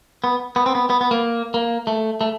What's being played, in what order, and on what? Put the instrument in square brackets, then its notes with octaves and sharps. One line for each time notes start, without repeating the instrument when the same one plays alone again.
[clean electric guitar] B3
B3
C4
B3
B3
B3
A#3
A#3
A3
A3